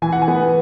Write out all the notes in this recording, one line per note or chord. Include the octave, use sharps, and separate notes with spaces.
E3 G#5
F#5
G#5
B3